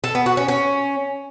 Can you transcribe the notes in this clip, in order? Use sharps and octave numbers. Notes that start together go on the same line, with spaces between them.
A4
B3
F#4
C#4
C#4